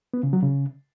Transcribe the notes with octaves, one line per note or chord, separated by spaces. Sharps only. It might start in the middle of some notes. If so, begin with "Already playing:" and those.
B3
C#3
F#3
C#3